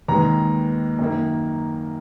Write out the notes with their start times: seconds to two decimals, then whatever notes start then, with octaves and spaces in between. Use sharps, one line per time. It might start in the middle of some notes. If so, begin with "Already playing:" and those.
0.08 D#2 D#3 G#3 B3 A#5
0.99 F#2 D#3 A#3